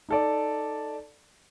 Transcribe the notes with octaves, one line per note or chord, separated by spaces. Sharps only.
D#4 A4 D5